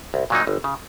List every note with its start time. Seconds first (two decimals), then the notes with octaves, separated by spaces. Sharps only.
0.14 C2
0.30 A#2 F#3 A#3 D#4
0.47 G1
0.64 C#3